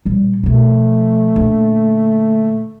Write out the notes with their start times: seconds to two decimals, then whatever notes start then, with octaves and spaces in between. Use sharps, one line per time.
0.05 A#2 G3
0.43 B2 F3 A3
1.36 A#2 D3